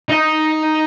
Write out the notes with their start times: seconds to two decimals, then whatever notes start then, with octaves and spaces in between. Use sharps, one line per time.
0.10 D#4 D#5